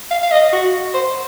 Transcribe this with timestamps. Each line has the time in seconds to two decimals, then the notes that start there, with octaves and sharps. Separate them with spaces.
0.11 F5
0.23 F5
0.32 D#5
0.53 F#4
0.94 C5